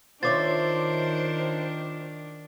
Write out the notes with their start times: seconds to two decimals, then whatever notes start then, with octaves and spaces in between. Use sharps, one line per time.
0.23 D#3 D4 F4 C5 C#5 E5 D6 A6